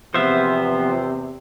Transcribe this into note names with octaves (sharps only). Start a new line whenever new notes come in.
E2 C3 F3 B3 C5 E5